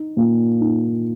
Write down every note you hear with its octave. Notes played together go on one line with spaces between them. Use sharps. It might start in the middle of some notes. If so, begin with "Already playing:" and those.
Already playing: D#4
A#2
D#4